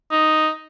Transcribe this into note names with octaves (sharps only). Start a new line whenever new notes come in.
D#4